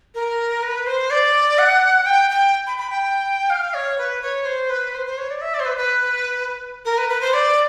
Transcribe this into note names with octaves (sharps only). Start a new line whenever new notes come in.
A#4
B4
C5
D5
F#5
G5
G5
B5
B5
G5
F5
C#5
B4
C#5
C5
B4
C5
C5
C#5
D5
E5
D5
C5
B4
B4
A#4
B4
B4
C5
D5